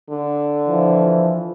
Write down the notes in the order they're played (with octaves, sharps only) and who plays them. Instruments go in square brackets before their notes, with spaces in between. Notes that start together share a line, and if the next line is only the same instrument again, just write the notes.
[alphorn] D3
[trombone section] E3 F3